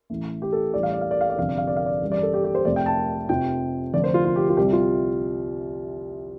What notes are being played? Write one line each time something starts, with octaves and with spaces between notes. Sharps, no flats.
A1 A2 A3
G4
A4
A1 A2 G3 D5
F5
D5
F5
D5
F5
D5
G1 F2 C3 F5
D5
F5
D5
F5
D5
A1 G2 G3
D5
A4
G4
G4
C5
F1 F2 C3 A3 D5
G5
A5
F1 F2 C3 F3 G5
F1 F2 D3 A3 D5
C5
F4
F4
G4
F4
C2 C3 G3 G4
F4